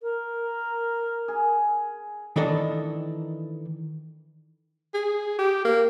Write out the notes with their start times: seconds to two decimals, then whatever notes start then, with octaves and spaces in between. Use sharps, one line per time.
0.03 A#4
1.28 G#4
2.36 D#3 E3 A3 D4 A4 D#5
4.94 G#4
5.39 G4
5.65 A#3